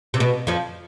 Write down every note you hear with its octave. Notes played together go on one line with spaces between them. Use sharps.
C3
B2
F2 F3